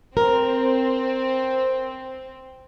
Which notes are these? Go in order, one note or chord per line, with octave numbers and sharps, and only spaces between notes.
C4 A#4